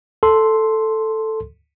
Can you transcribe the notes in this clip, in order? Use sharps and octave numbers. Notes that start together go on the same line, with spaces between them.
A4 C6